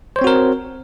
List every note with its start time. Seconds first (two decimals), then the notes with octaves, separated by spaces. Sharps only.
0.16 C5
0.19 C#5
0.21 C4
0.24 F#4
0.27 A#4